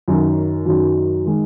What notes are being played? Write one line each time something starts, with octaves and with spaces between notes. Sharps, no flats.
F#2 D#3 F#3
F#2 D#3 F#3
D#3 G#3